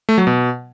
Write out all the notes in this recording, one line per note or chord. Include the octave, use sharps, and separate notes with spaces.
A3
F#3
B2